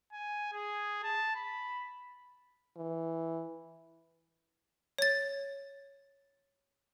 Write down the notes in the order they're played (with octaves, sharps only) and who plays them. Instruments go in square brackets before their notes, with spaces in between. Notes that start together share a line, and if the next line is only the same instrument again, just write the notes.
[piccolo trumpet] G#5
G#4
A5
B5
[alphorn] E3
[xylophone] C#5 A6